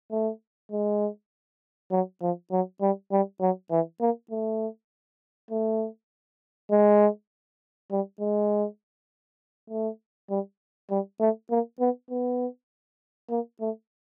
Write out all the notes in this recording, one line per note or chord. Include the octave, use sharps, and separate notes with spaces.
A3
G#3
F#3
F3
F#3
G3
G3
F#3
E3
A#3
A3
A3
G#3
G3
G#3
A3
G3
G3
A3
A#3
B3
B3
A#3
A3